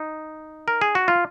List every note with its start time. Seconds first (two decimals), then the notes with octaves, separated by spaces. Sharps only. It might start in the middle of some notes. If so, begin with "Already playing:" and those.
Already playing: D#4
0.68 A#4
0.81 G#4
0.95 F#4
1.08 F4